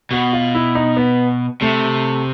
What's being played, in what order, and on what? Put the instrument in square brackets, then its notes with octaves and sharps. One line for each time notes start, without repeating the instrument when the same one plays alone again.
[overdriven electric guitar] B2 [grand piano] F#4
[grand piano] F4
E4
D#4
B3
[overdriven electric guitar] C3 [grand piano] A3